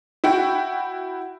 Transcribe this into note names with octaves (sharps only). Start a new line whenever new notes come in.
E4 F#4 G5